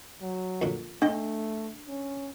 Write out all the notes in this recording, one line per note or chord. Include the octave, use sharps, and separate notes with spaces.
F#3
F2 A#2 D3
A3 D4 D#5 G5
C#4